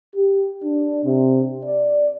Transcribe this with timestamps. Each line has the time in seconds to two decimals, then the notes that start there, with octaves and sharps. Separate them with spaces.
0.15 G4
0.63 D4
1.04 C3
1.64 D5